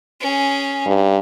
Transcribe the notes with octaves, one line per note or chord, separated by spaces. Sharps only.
C#4 G#4
G2